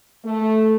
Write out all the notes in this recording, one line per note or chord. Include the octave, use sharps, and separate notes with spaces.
A3